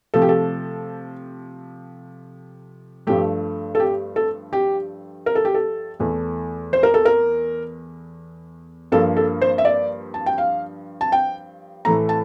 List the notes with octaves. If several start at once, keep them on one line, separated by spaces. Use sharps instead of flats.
C3 F3 A3 A4
G4
A4
G2 F3 A3 G4
A4
G4
A4
G4
A#4
A4
G4
A4
E2 E3 A3
C5
A#4
A4
A#4
G2 F3 A#3 A4
A4
C5
E5
D5
A5
G5
F5
A5
G5
A2 E3 A3 A#5
A5